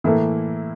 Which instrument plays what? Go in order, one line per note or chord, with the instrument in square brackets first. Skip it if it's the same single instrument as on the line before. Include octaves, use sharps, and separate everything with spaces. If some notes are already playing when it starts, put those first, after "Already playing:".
[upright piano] A2 E3 A#3 E4 A4